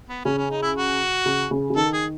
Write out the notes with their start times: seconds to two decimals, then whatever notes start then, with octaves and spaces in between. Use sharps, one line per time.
0.09 B3
0.25 C#3 C#4
0.38 C#4
0.51 D#4
0.62 E4
0.76 F#4
1.26 C#3
1.51 C#3
1.70 C#3
1.76 D#3 A4
1.93 G#4